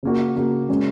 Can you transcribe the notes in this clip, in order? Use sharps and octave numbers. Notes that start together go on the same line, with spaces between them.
C#3 A#3 F#4
C#3 A#3 F#4
C#3 G#3 C#4